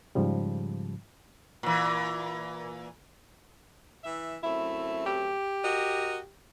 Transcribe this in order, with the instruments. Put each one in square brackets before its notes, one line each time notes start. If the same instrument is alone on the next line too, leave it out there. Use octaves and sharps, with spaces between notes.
[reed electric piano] G#2 C#3 F3 G3
[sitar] A#2 E3
[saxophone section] E3 E5
[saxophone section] F#2 A3 C4 [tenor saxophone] E4
[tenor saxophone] G4
[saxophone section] F#4 A#4 D#5